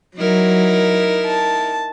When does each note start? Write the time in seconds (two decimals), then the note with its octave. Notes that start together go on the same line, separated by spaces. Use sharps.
0.18 F#3 D#4 E4 A#4
1.28 A5